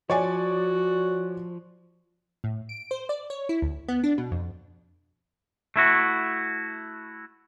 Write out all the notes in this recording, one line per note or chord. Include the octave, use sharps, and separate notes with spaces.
F3 F#4 C#5 D5 G#5
A2
D7
C5
D5
C#5
E4
D2
B3
D4
B2
F2
A3 E4 F#4